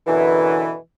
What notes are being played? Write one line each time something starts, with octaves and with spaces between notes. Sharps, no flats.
F#2 B2 D3 E3